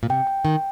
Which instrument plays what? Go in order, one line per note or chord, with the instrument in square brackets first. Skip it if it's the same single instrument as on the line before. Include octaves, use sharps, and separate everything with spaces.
[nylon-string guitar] A#2
[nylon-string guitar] C3 [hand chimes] G5
[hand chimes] G5
[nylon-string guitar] D#3 [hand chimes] G5